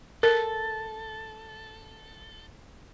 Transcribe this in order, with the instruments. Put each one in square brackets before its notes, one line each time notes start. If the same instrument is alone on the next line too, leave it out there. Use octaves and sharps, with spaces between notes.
[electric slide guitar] A4 [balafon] A#4